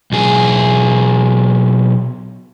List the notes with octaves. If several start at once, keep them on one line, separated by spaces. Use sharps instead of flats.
B1 G#4